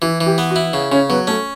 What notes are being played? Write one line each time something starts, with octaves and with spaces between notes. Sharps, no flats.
E3 E4
E3
G4
B3
F#4
E4
C#3
C#3 C#4
F#3 B3
A3 C#4